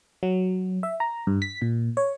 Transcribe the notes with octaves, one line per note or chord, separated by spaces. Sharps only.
F#3
E5
A#5
G2
B6
A#2
C#5